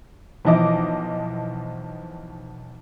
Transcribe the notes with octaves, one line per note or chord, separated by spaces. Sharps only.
B1 E3 F3 D#5 D6